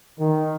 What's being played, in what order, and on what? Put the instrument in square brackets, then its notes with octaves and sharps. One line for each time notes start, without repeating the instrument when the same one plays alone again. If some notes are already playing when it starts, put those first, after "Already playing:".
[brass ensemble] D#3